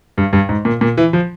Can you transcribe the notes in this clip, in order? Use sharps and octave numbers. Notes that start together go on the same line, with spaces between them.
G2
G2
G#2
A#2
A#2
E3
F3